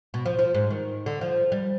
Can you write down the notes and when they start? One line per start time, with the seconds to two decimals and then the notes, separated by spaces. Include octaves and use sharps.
0.14 B2
0.26 F3
0.39 F3
0.54 G#2
0.70 D#3
1.06 D3
1.21 F3
1.52 G3